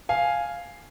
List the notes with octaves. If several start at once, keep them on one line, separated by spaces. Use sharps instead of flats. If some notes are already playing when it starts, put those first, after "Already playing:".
F5 G#5